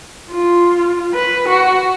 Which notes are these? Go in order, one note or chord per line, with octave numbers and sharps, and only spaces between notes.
F4
B4
F#4